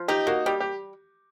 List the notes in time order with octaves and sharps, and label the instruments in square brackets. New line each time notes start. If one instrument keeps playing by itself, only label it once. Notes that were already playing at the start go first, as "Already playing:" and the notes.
Already playing: [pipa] F3
[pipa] D#4 [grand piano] G4
[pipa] A#3 [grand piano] F#4
[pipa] G3 [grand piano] G4
[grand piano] G4